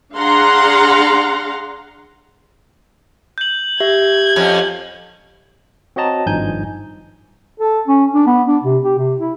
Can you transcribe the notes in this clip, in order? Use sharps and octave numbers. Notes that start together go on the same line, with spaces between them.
D4 G#4 F5 F#5 A#5 C6
G6 F#7
G4 E5 G#6
F2 C#4
C4 F#4 C#5 D#5 A5 A#5
G#1 G2 F3 D#4 G#5 G6
A4
C#4
D4
B3
D4
C3
G4
C3
E4